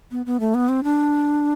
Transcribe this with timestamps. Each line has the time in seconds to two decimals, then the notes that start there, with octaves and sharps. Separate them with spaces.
0.11 B3
0.26 B3
0.40 A3
0.54 B3
0.69 C4
0.84 D4